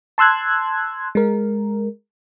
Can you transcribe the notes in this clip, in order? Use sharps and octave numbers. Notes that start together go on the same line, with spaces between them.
A5 C6 E6 F#6 G#6
G#3 A#4